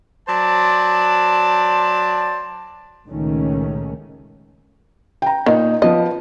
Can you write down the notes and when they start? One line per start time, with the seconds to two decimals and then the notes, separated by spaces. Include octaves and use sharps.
0.28 F#3 C5 D5 A5
3.07 C#2 A#2 D#3 A3 C#4
5.22 G5 A#5
5.46 A#2 D#3 D#4
5.82 F3 B3 D#5